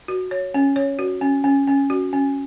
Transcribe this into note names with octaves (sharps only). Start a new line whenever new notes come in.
F#4
C#5
C#4
C#5
F#4
C#4
C#4
C#4
F#4
C#4